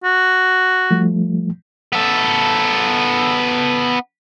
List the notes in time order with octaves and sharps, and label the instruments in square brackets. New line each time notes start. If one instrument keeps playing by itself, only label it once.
[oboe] F#4
[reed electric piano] F3 G3 A3
[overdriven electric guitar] B3 A4